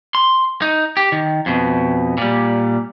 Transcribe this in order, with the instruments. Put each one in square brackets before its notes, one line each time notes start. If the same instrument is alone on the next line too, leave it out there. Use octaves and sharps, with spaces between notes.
[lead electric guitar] C6
D#4
G4
D#3
F2 B2
A#2 G3